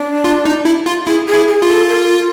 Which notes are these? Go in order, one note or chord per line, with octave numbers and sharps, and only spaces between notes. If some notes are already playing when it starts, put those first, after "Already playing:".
Already playing: D4
F4
D#4
E4
F4
E4 G#4
G#4
E4
G#4
F4
A4
A#4